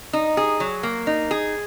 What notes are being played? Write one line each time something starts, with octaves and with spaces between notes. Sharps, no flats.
D#4
G#4
F#3
A#3
D#4
G#4